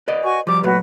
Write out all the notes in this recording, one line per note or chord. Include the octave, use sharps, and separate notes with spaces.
B4 D5 D#5
F#4 G#5 C#6
F3 G3 D6
A#2 F#3 A3 F#4 B4